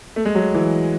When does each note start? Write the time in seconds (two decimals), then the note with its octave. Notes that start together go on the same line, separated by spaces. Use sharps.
0.16 A3
0.25 G#3
0.35 F#3
0.55 E3